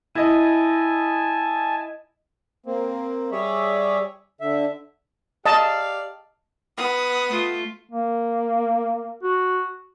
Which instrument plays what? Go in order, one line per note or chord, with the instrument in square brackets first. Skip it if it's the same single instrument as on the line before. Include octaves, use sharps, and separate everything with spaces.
[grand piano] E4 D#5 [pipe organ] G#5 A5
[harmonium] A#3 C4
G3 G#4 C#5 D5 E5
D3 E5
[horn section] G4 D5 F5 [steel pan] D#5 A5
[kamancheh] B3 D#6
[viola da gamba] A3 F4
[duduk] A#3
F#4